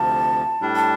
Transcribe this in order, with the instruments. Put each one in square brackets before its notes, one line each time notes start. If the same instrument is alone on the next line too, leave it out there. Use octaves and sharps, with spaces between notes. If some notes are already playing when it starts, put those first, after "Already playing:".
Already playing: [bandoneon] D2 C3 F3 [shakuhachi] A5
[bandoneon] A2 G3 D4
[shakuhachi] A5